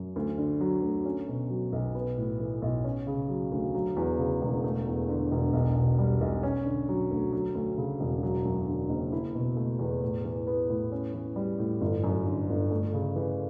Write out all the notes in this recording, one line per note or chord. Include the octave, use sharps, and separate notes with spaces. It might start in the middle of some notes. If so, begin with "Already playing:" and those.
Already playing: F#2
D2
D3
F#3
D2
C#4
B2
F#3
B1
B3
A2
E3
B1
C#4
C#3
F#3
D2
F#3
E2
C#3
E1
A3
E2
D3
E1
B1
B2
G3
B1
C#4
D3
F#3
D2
F#3
D2
C#3
E1
F#3
F#2
D3
F#1
E4
B2
A3
E2
A2
E3
B3
A2
C#4
E3
G3
A2
G1
F#2
D3
G1
A3
C#3
E3